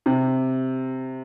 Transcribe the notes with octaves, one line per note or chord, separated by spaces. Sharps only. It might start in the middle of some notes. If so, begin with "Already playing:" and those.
C3